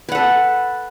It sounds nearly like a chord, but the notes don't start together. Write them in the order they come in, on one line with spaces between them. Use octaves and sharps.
B4 F#5 A4